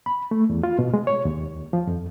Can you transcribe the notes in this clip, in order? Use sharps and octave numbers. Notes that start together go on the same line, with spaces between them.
B5
A3
E2
F4
B2
G#3
C#5
D#2
F3
F2